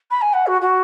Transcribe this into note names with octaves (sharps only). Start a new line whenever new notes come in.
B5
G#5
F#5
F#4
F#4